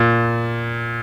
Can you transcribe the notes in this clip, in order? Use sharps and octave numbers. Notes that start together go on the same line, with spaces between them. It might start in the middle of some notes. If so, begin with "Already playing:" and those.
Already playing: A#2